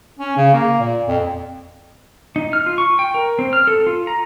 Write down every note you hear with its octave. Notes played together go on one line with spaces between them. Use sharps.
C#4
C#3
A#3
A#2
F2
D#4
F6
F4
C#6
G5
A#4
C4
F6
A4
F4
A#5